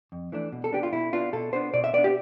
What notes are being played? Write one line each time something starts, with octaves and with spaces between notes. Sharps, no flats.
F2
E3 A3 D4
B2
A4
B3 D4 G4
F4
B2 E4
B3 D4 F4
B2 A4
B3 D4 C5
B2 D5
E5
B3 D4 D5
G4